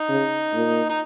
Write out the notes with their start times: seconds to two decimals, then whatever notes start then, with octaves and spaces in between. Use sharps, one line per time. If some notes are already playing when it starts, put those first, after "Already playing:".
Already playing: D#4
0.09 C#3
0.54 A#2
0.89 D#4